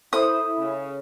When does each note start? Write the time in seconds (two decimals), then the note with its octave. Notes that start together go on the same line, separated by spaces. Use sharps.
0.13 E4 A4 C5 D#6
0.58 C#3